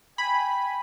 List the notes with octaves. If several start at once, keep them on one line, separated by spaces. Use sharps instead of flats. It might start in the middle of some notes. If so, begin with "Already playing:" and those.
G5 G#5 B5